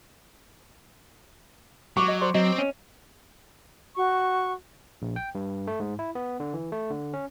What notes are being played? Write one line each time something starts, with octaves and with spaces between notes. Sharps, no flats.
F#3 C#6 D6
D#5
A4 C5 D5
F#3 C4 D#5
C#4
F#4 C#6
A#1
G5
G2
A3
G#2
E4
B3
D3
E3
A3
D3
C#4